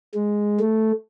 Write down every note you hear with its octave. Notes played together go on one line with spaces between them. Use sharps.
G#3
A3